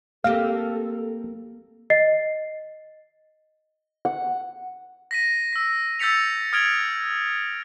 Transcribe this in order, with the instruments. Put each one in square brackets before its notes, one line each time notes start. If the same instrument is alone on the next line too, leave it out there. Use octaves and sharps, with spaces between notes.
[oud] A#3 C4 G4 [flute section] A4 [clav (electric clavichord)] F5
[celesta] D#5 A6 C7
[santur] F#5
[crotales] A#6 B6 D#7
E6 B6
E6 G6 A6 B6 C#7 F7
D#6 F6 G#6 D7 F7 G7